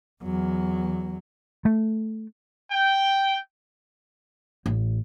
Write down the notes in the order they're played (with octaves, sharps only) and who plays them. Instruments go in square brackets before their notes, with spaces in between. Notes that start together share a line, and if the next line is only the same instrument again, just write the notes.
[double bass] E2 F#3
[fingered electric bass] A3
[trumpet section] G5
[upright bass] A1